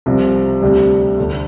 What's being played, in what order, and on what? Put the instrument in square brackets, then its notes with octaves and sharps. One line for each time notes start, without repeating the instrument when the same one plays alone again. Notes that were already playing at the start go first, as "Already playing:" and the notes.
[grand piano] C2 C3 F3
D2 C3 G3 D4 G4
D2 D3 A3